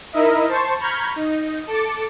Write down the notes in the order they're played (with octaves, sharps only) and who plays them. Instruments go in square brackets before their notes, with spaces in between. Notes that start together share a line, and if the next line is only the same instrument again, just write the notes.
[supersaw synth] D#4 E4 A#4 D#5 E5
C5 A5 C6 C#6
A#5 B5 C#6 F6 G6 G#6
D#4
A4 D6 A6 C#7